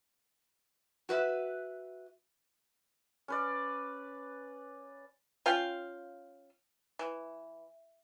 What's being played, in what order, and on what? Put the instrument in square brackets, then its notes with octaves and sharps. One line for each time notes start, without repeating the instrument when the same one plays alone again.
[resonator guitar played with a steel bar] F#4 B4 E5
[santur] C#4 B4 D5
[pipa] C#4 F4 F5 G5
E3